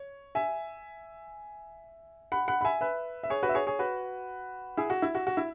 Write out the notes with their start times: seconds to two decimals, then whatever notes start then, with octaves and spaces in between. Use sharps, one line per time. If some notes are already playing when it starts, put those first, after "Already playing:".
Already playing: C#5
0.35 E5 G#5
2.32 F#5 B5
2.48 F#5 B5
2.61 B5
2.65 E5 G#5
2.81 B4 E5
3.23 E5
3.30 G#4 C#5
3.43 F#4 B4
3.49 E5
3.55 G#4 C#5
3.67 G#4 C#5
3.79 F#4 B4
4.77 E4 G#4
4.90 F#4
5.02 E4
5.15 F#4
5.27 F#4
5.37 E4